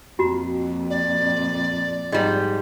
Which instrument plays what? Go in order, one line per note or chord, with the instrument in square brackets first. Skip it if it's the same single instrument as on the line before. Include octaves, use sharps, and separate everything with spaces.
[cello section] F2 A#2 [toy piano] F4 F#4 A#5
[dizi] D5
[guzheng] G#2 G3 [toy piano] F4 D#5